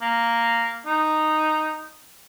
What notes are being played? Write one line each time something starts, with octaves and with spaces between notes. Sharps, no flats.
A#3
D#4